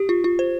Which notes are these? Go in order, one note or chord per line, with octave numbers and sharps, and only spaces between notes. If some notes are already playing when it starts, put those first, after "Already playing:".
Already playing: G4
F4
F4
C5